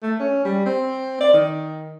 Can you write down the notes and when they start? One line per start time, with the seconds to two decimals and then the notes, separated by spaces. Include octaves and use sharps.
0.03 A3
0.20 C#4
0.45 G3
0.66 C4
1.20 D5
1.33 D#3